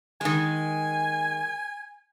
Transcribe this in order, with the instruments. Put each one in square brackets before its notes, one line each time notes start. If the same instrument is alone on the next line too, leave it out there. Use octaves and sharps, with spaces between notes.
[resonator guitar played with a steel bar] D#3 G#3 [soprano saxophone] G#5